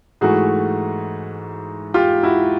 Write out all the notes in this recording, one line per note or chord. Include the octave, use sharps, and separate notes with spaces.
G#2 E3 A3 F#4 G#4
F4 G4
E4 F#4